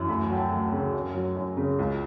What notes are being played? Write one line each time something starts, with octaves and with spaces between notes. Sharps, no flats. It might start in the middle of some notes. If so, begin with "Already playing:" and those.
Already playing: F#2 E3
D2 B5
F#3 G5
A5
D2
G5
C#3
F#2
F#3
F#2
C#3
C#2